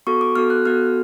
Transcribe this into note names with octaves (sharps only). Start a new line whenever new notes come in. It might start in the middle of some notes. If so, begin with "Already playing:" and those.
B3 F#4 A4 C#6
D6
B3 F#4 A4 F6
F#6
B3 F#4 A4 F6